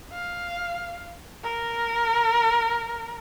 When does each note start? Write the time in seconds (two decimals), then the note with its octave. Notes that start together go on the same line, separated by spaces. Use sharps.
0.12 F5
1.44 A#4